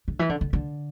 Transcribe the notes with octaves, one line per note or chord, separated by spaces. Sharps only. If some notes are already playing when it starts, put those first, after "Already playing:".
D3
E3
D3
D3
D3